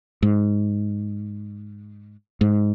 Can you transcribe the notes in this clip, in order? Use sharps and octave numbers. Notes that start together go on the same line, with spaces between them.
G#2
G#2